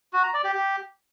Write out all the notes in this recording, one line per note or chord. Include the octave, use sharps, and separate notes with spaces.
F#4
A#5
D5
G4
G4